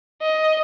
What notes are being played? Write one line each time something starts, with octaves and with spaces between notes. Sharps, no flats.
D#5